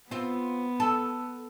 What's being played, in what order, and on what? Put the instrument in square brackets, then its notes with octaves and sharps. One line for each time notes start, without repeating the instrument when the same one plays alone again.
[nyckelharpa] B3 [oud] C4 F4
[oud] A4